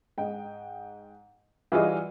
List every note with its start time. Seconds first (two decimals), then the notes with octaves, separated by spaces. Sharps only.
0.18 G#2 D#5 G5
1.72 E3 G3 F4 F#4 G#4 D#5